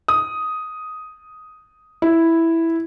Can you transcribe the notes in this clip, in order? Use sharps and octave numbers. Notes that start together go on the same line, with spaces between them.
D#6
E4